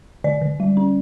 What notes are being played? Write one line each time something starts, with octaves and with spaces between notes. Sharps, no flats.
D3 D5
D3
G3
C#4